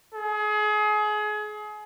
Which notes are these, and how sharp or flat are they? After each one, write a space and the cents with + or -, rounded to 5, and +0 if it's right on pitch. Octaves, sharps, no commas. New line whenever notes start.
G#4 +30